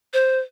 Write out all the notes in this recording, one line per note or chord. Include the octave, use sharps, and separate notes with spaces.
C5